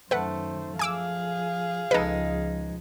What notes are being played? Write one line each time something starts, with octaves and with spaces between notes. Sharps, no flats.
F#2 D#3 A3 B4 C5 F#5
F3 G#4 F5 G#5 D6 E6
C#2 F3 G#3 D#4 A4 B4